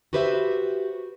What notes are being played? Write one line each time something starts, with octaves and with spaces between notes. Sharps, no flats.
F#4 G4 B4 C5 D#5 E5